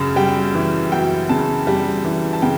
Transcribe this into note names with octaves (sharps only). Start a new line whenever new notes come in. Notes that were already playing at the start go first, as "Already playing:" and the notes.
Already playing: F#2 C#3
G3 G5
E3
F#2 G5
C#3 A5
G3
E3
A5
C#3 G5